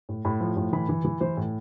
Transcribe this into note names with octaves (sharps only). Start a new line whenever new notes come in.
A2
A2 B5
F3
A2
E3 B5
E3
E3
E3 C5
A2